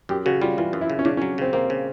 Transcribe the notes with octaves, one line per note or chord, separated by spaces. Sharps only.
F#2 G4
C#3 F#4
G3 F4
E3 F4
F#2
E4
C#3
C#4
C#3 D4
C#4
F#3
C#3 C4
A#3 C4
C#3